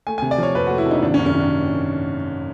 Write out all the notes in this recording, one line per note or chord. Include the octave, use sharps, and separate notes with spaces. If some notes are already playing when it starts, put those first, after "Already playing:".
A3 G#5
G#5
C3
D5
F3 C#5
F2 B4
F#4
A3
E4
C3 D#4
D#4
G#1 D4
C#4
F#2
C#4
D#3 D4